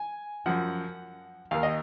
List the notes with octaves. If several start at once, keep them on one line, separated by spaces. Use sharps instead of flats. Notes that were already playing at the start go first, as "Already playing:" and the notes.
Already playing: G#5
F#2 F3 F#5
D#2 D#3 F5
D#5